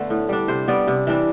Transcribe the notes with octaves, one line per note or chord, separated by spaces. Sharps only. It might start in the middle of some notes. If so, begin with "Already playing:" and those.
Already playing: D3 A3 B3
A2
G3 D4
C3 C5
G3 B3 D5
C3
E3 G3 D4